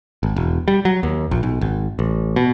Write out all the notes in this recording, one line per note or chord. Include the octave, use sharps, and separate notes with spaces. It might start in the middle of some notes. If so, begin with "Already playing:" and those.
G#1
E1
G3
F#3
D#2
A#1
B1
G#1
A1
B2